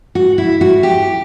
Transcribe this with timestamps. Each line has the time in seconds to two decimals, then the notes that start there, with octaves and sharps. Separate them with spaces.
0.15 F#4
0.38 E4
0.61 F#4
0.83 G4